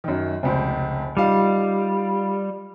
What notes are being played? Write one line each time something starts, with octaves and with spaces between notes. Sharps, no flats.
F#2 D#3
F1 C#2 C5
G3 D#4 F4 F5